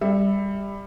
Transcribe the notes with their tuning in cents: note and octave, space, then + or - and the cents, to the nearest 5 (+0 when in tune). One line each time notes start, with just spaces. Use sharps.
G3 +20 E5 -5